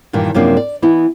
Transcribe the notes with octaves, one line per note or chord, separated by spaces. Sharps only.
G2 A#2 D#3 E3
F#2 C3 F3 A#3 D4
D5
E3 B3 D#4 E4